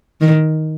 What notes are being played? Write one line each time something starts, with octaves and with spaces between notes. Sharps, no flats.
D#3